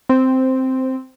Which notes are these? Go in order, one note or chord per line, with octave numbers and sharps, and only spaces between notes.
C4